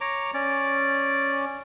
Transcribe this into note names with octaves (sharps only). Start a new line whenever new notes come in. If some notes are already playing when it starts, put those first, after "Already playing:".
C#5 A#5 D6
C#4 D5